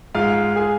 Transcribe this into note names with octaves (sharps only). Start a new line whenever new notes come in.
G#2 G#3 F4 F5
G#4 G#5